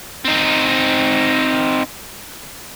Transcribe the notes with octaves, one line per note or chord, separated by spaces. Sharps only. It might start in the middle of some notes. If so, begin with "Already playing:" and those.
C4 D#4